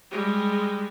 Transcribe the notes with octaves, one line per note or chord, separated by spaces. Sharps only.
G3 G#3